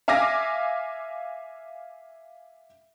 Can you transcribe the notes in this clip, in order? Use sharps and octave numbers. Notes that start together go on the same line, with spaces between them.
E5 F5 G#5 D6 F6 A#6